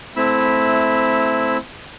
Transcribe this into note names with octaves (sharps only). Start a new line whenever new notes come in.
A3 C4 E4 B5 E6